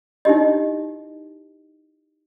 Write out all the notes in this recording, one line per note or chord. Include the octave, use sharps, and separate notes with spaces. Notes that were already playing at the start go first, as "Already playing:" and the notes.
D#4 E4 G4 D#5